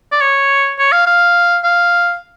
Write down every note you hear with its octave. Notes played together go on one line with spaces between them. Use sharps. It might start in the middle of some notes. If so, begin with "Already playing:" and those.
D5
C#5
C#5
F5
F5
F5